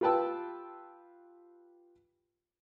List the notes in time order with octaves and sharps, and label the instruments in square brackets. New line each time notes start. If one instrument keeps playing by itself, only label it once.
[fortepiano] F4 G4 B4 G5 A5 E6